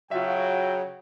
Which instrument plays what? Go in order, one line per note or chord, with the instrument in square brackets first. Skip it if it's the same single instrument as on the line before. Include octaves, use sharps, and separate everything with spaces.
[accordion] C#3 [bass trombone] F#3 [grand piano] F4 F#4 E5 [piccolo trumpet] G5